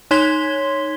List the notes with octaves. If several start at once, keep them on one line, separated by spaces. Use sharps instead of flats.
D#4 C#5 C6 G#6 B6 G7